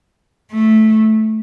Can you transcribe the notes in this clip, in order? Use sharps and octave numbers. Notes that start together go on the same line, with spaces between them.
A3